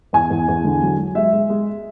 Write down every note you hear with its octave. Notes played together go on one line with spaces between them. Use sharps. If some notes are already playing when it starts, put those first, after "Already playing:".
E2 G#5
E2
E2
D3
F#3
F#3
G#3 E5
G#3
G#3